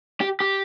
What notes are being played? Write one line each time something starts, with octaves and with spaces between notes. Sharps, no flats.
G4
G4